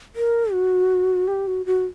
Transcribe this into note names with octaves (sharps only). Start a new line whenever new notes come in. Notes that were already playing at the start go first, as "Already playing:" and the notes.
A#4
F#4
G4
F#4
F#4